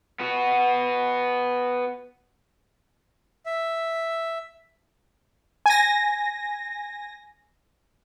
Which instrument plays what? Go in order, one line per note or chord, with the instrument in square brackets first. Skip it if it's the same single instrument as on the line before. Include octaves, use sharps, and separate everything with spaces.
[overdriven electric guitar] B3 F#4
[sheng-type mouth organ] E5
[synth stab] G#5 A#6